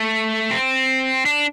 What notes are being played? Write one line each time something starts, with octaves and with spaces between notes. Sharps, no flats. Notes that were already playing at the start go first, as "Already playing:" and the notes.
Already playing: A3
C4
D4